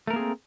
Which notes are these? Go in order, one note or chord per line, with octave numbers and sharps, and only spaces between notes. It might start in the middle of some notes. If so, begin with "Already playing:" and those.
A3 A#3 C4 G#4 A#4